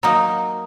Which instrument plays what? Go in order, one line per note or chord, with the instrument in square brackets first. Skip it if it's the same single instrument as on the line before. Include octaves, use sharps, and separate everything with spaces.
[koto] F#3 A#3 D#4 [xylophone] A#5